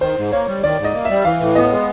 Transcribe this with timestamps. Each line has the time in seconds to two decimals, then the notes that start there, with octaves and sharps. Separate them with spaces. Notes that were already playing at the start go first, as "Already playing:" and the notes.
0.01 D#3 C5
0.17 G#2
0.32 A#3 C#5
0.48 G3
0.63 D#3 D5
0.79 G#2
0.84 D#5
0.94 A#3
1.05 G3 E5
1.25 E3 F5
1.40 A2
1.55 B3 D#5
1.71 G#3